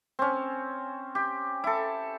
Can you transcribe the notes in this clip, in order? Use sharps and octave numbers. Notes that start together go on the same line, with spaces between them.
C4 C#4
G4
E4 A4